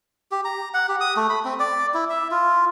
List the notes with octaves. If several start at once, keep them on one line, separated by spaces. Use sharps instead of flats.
G4
A#5
F#5
G4
D#6
A3
B5
C4
D5
E4
E5
F4